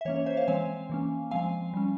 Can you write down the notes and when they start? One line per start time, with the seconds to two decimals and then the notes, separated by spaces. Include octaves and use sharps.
0.01 E5
0.05 E3 A#3 C#4 C#5
0.16 C#5
0.26 C5 E5
0.37 C#5 F5
0.47 E3 G#3 C4 F5 G#5
0.90 E3 A#3 C#4
1.31 F3 G#3 C4 F5 G#5
1.74 G3 C#4